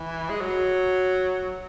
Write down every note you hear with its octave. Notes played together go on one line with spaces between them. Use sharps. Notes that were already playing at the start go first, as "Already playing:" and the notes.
Already playing: E3
G#3
F#3